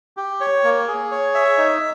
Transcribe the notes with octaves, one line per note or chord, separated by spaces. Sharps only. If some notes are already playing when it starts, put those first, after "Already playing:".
G4
C#5
A#3
G#4
C#5
E5
D#4